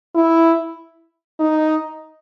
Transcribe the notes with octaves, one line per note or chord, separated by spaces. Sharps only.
E4
D#4